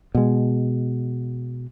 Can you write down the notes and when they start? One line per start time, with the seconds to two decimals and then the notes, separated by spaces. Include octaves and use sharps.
0.15 B2 G#3